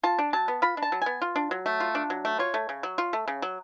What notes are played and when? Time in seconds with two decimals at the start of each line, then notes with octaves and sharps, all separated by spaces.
0.03 F4 A5
0.19 D4
0.33 F#3 A5
0.48 B3
0.62 F4 B5
0.77 D4
0.83 A5
0.92 F#3
1.02 B3 G#5
1.22 F4
1.36 D4
1.51 F#3
1.66 A3
1.80 F4
1.95 D4
2.10 F#3
2.25 A3
2.39 F4 C#5
2.54 A3
2.69 C#3
2.83 F#3
2.98 F4
3.13 A3
3.28 C#3
3.42 F#3